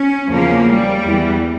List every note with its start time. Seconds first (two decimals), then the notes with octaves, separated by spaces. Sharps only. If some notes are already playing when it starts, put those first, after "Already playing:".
Already playing: C#4
0.29 E2 C#3 F3 A#3
0.66 G3
1.03 E2 E3